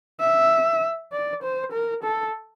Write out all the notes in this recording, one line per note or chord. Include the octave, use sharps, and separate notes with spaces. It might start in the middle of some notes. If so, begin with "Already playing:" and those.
E5
D5
C5
A#4
A4